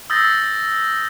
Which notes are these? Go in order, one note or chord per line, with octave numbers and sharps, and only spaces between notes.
D#6 E6 G6 A6 A#6